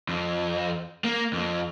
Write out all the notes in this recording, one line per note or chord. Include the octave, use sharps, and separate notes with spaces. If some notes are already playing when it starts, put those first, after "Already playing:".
F2
A#3
F2